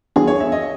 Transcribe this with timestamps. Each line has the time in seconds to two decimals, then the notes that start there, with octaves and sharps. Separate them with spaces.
0.16 E3 G3 B3 D4 F#4 G#4
0.27 C#5
0.40 E5
0.52 D#5